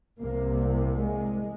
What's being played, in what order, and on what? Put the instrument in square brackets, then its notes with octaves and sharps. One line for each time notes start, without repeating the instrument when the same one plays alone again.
[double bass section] C2 C3 A#3
G#3